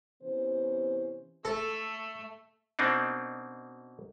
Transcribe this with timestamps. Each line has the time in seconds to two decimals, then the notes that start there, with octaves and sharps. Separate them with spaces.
0.23 C3 E3 B3 C#4 C5
1.45 A3 A4
2.79 B2 A#3 C4 D4 D#4